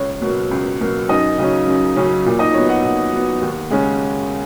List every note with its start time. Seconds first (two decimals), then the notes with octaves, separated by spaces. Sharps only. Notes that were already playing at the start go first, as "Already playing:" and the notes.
Already playing: C#2 C#5
0.22 B2 F#3 A#3
0.51 C#2
0.81 B2 F#3 A#3
1.09 F#2 D#4 D#5
1.38 C#3 F#3 C#4
1.67 F#2
1.96 C#3 F#3 C#4
2.26 A#2
2.39 D#4 D#5
2.54 F#3 B3 C#5
2.69 F#4 F#5
2.83 A#2
3.12 F#3 B3
3.41 D#2
3.70 C#3 G#3 C#4